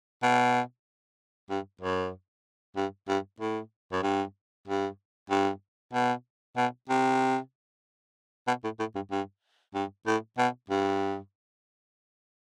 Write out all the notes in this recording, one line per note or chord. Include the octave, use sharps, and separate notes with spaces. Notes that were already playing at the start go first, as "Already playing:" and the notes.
B2
G2
F#2
G2
G2
A2
F#2
G2
G2
G2
B2
B2
C3
B2
A2
A2
G2
G2
G2
A2
B2
G2